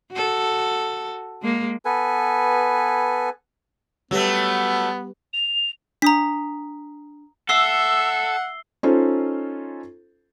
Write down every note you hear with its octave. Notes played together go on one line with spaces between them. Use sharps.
F#4 A4
G#3 A#3
B3 A4 B4 G#5
F#3 G3 A3 B3 G4 B4
F7
D4 A#5 D#6 B6
A4 E5 F#5 E6 C7 G7
C#4 D#4 F4 A4 C5